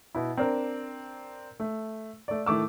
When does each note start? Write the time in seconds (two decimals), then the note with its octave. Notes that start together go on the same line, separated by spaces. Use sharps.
0.15 B2 E4
0.37 C4 D4 A#4
1.60 A3
2.28 A3 D5
2.46 A2 D#3 A3 D6 E6